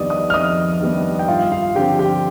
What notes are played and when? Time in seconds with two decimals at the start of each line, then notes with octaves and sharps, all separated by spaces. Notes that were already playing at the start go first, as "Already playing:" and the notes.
Already playing: F2 D#3 G3 B3 D4 D5 D#5 D#6
0.10 D#5 D#6
0.30 F6
0.34 F2 D#5 D#6
0.81 D#3 G3 B3 D4
1.19 G5
1.28 G2 F4 F5
1.52 F4 F5
1.75 D3 F3 C4 G4 G5
1.99 G4 G5